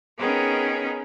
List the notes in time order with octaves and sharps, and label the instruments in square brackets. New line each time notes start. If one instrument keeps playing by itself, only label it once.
[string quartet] B3 C#4 D#4 G#4 A#4 G5